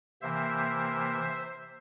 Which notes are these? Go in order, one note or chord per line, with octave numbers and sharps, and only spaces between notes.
C3 E3 A#3 C5 E5